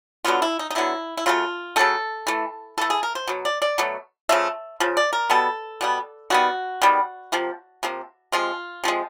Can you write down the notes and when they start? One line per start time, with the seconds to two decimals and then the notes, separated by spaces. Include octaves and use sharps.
0.25 D3 F#3 B3 F4
0.42 E4
0.59 D#4
0.70 D#4
0.75 D3 F#3 B3 E4
1.17 E4
1.26 C#3 F#3 A3 F4
1.76 C#3 F#3 A3 A4
2.27 E3 A3
2.78 E3 A3 A4
2.90 G#4
3.03 A#4
3.15 C5
3.27 B2 F#3
3.45 D5
3.62 D5
3.78 B2 F#3 A3
4.29 C#3 F3 A3 E5
4.80 C#3 F3
4.97 D5
5.13 A#4
5.30 B2 G3 B3 A4
5.81 B2 G3 B3
6.30 D#3 G3 B3 F#4
6.82 D#3 G3 B3
7.32 C3 F3 A#3
7.83 C3 F3 A#3
8.32 C3 F3 G#3 F4
8.84 C3 F3 G#3